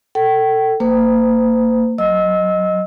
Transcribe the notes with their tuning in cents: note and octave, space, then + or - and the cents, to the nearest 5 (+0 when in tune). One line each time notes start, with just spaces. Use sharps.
A4 +25 G5 -35
A#3 -30 C5 -40
F#3 +0 D#5 +0 E6 -20